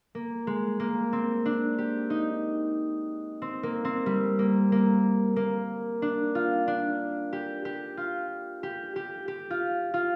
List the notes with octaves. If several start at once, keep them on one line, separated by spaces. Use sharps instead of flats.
A#3
G#3
A#3
C4
D4
G4
D#4
C4
A#3
C4
G3
A#3
A#3
A#3
D4
F4
D4
G4
G4
F4
G4
G4
G4
F4
F4